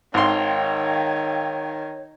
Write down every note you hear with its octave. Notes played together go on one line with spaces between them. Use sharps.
G#1 D#3 C#5 F5 G5 C6